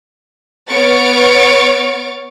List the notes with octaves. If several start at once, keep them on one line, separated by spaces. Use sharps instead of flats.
B3 C#5 C#6 F6 A6 D7